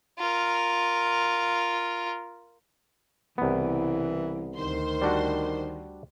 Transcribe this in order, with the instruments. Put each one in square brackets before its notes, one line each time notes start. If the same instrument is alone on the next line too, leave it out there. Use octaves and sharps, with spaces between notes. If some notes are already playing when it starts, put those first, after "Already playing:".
[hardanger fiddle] F4 A#4
[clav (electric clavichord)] C2 B3 [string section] C#3 [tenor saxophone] E3
[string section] D2 C5 C6 [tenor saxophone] D#3
[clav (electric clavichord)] G3 D4 F#4